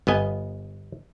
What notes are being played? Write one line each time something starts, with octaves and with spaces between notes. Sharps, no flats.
G1 B3 D#5 G#5